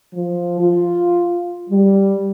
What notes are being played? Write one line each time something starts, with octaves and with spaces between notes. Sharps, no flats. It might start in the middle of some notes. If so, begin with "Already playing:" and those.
F3
F4
G3